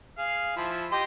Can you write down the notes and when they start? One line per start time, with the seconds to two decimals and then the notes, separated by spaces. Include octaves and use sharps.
0.18 G#4 F5
0.56 F3 E4
0.92 G4 D#5 C6